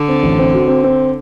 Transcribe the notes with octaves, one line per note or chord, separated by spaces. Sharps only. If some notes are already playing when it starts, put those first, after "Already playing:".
Already playing: D3
C4
A1
C4
F#4
C4
C4